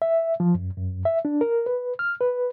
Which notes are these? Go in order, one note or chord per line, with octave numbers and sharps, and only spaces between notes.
E5
F3
F#2
F#2
E5
D4
A#4
B4
F6
B4